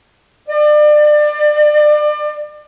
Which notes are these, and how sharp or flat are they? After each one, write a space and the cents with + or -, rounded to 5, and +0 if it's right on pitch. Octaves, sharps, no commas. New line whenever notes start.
D5 +30